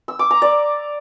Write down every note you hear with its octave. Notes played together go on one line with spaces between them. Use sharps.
E6
D6
A#5
D5